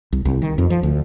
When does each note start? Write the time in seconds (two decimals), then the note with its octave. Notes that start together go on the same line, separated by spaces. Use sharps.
0.12 C2
0.25 C2
0.42 D#3
0.58 F2
0.70 F3
0.83 D2